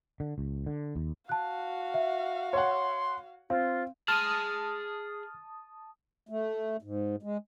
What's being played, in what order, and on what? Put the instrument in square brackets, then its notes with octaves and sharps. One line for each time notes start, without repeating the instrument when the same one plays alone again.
[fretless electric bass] D3
C#2
D3
D#2
[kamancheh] F#4 F5 [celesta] A5 F#6
[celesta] E5
[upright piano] C#5 F#5 [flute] C6
[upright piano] C4 [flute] F4 [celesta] F5
[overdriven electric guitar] G#4 C6 [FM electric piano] A5 D#6 [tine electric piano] F6
[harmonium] A3
G#2
G#3